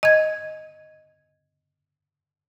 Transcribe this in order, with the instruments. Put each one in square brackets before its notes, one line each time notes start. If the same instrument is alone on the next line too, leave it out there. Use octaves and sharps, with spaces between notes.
[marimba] D#5 G#6